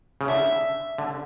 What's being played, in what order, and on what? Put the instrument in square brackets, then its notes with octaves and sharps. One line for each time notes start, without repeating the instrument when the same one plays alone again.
[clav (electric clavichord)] C#3
[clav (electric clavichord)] D3 [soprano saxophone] E5
[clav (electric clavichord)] D3